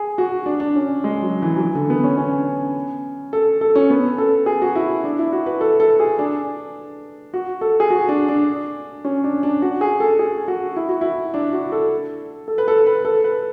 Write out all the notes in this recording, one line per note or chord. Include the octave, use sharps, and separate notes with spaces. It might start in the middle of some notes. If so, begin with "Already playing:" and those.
Already playing: G#4
F#4
D4
D4
C#4
G#3
F#3
E3
F#3
E3
D3
B3
C#4
C#4
A4
A4
C#4
B3
A4
G#4
F#4
E4
D4
E4
F#4
B4
A4
A4
G#4
D4
F#4
A4
G#4
F#4
D4
D4
C#4
D4
D4
F#4
G#4
A4
G#4
F#4
E4
F#4
E4
D4
F#4
A4
A4
B4
A4
B4
A4
B4